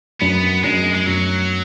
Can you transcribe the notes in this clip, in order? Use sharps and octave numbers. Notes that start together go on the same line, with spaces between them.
F#2 B3
F#2 G#3
G#3
F#2 F#3